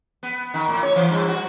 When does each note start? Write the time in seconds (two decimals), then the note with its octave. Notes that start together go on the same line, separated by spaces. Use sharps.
0.23 B3
0.54 D#3
0.68 A2
0.83 C#5
0.96 E3
1.11 G2
1.28 F#4